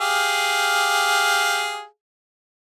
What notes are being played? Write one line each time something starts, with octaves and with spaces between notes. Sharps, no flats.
G4 G#4 F5